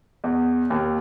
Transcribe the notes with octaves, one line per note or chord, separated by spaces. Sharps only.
E2
D#2